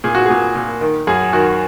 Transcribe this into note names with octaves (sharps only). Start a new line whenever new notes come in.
A#2 G#4
F#4
A#2 G#4
A#2
D#3
F#2 G#4
D#3 F#4